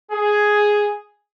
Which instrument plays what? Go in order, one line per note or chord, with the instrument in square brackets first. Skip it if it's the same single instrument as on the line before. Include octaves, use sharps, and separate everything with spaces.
[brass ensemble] G#4